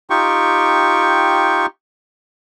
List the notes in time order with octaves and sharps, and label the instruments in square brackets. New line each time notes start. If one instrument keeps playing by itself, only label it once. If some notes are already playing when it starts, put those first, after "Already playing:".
[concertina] D#4 F4 G4 G5 C#6